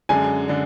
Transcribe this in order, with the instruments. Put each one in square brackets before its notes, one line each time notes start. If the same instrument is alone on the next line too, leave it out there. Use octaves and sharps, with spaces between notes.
[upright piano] F#2 D3 G#3 D4 [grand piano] G#5
[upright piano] D3 G#3 D4